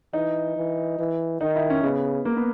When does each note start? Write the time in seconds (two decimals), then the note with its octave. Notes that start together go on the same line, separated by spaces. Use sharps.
0.13 E3 D#4
0.56 E3
0.99 E3
1.41 D#3 D#4
1.55 E4
1.70 C#4
1.83 C#3 B3
2.25 A#3
2.37 B3